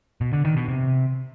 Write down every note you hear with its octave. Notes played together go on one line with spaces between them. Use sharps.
B2
D3
D#3
B2
C3